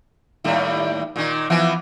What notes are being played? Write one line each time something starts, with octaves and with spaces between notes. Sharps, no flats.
D#2 A2 G3
A#2 D#3
E3 F3 B3